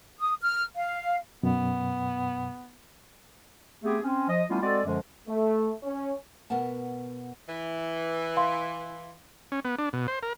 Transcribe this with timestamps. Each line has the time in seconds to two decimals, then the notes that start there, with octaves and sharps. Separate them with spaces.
0.19 D#6
0.41 F6
0.76 F5
1.43 F#2 B2 B3
3.83 A3 B3 C4 G4 G#4
4.03 C4 C#4
4.29 F3 D#5
4.49 G3 A3 B3 C#4 E4 F4
4.61 G#3 C4 F#4 A4 D5
4.85 F#2 D3 F3 G#3
5.28 A3
5.83 C#4
6.50 B2 B3 A#4 F#5 A5
7.48 E3
8.37 F5 C6
9.52 C#4
9.65 B3
9.78 D4
9.93 B2
10.08 C5
10.23 A#4